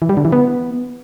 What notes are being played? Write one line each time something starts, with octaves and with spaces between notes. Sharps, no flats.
E3
G3
D3
E3
B3